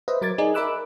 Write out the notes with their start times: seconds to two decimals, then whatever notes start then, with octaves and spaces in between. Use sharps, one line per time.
0.08 B4 C5 D#5 E5
0.21 F#3 A#4 D6 G#6 A6
0.38 D#4 G#4 D5
0.54 A#4 E5 B5 D6 E6 F#6